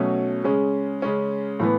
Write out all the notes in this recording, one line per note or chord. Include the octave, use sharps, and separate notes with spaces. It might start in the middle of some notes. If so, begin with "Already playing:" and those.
Already playing: B2 F#3 A3 C#4
C#3 G#3 C#4
C#3 G#3 C#4
A2 E3 B3